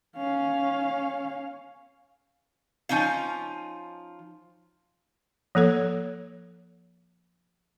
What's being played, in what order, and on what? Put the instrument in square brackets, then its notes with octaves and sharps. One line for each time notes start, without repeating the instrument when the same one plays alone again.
[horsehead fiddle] C#4 F5
[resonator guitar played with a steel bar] F3 C#4 D#4 F5
[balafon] F3 A#3 A4 C#5